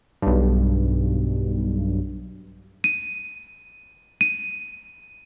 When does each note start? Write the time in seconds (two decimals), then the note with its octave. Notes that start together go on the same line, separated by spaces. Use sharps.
0.22 B1 G2
2.84 D#7
4.21 D#7